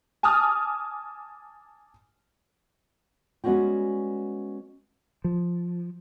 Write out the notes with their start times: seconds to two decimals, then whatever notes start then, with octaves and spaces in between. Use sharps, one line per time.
0.23 G#5 A5 D6 D#6 F6
3.44 G3 G#3 B3 C#4 F#4 G4
5.24 F3